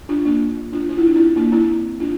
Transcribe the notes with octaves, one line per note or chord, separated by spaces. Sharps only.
D4 F4
A#3 D4
D4 F4
F4
E4
D4
C4 E4
A#3 D4
C4 E4
D4 F4